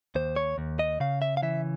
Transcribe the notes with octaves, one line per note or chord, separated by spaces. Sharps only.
D#2 C5
C#5
D#2
D#5
C#3 F5
E5
F5
E3 E5